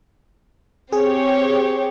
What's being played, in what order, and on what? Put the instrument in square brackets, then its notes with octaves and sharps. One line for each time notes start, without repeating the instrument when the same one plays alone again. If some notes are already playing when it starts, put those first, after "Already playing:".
[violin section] C4 G4 C#5 [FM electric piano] G#4